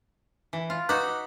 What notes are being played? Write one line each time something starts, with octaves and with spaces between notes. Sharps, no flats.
E3
F4
D#4 F#4 B4 D6 F#6